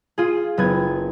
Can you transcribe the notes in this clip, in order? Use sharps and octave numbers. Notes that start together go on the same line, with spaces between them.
F4 G#4
F#1 B3 G#6